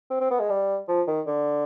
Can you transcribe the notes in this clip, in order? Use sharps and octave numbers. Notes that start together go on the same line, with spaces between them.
C4
C4
B3
G#3
G3
F3
D#3
D3